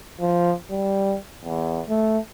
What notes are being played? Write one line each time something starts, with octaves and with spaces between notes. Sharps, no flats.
F3
G3
E2
A3